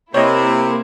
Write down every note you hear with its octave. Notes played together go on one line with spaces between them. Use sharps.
C3 A#3 E4 C#5 D#5